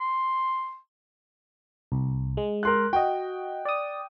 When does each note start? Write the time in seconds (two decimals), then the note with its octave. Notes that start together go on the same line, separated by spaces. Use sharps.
0.01 C6
1.92 C2
2.37 G#3
2.63 A#4 C6 F#6
2.93 F#4 D#5 G5
3.65 D5 D#6